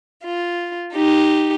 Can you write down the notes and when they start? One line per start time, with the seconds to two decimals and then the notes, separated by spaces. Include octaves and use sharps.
0.23 F4
0.94 D#4 G4